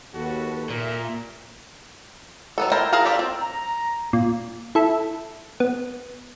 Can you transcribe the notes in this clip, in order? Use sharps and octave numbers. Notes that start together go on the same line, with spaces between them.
D#2 F#4 A4 B4
A#2 A#4 E5
F#3 B3 A4
E4 A#4 C5 G5 A5
G#4 A#4 F5 A5 A#5
D4 F4 G4 A4
C4
A#5
A#2
E4 A4
B3